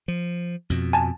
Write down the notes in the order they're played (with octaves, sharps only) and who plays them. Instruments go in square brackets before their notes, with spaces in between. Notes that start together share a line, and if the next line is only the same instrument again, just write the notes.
[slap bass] F3
F2 B2
[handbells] G#5 A5